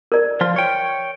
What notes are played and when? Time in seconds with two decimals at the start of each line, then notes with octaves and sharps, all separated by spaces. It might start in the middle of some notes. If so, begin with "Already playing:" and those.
0.12 A#4 D5
0.41 F3 F4
0.56 C#5 G5